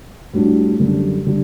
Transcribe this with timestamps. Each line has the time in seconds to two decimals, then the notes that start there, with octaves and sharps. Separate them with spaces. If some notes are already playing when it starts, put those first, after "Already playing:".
0.33 A2 G3 D4 F#4
0.79 F#2 D3 G3
1.26 D3 G3